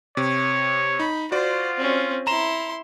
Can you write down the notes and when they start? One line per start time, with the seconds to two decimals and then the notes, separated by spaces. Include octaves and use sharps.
0.17 C3 C#5
1.00 D#4 B5
1.32 F4 F#4 C5 D5
1.78 C4 C#4
2.27 E4 A#5 C6 E7